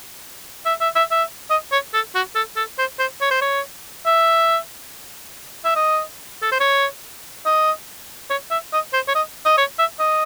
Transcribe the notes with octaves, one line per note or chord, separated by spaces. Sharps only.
E5
E5
E5
E5
D#5
C#5
A4
F#4
A4
A4
C5
C5
C#5
C5
C#5
E5
E5
D#5
A4
C5
C#5
D#5
C#5
E5
D#5
C5
C#5
D#5
D#5
C#5
E5
D#5